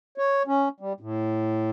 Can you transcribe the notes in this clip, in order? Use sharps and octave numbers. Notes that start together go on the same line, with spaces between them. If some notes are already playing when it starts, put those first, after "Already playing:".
C#5
C#4
G3
A2